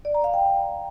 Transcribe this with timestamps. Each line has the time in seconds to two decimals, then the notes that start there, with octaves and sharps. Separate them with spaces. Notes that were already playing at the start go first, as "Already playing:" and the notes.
0.05 D5
0.14 A#5
0.24 F5
0.34 G5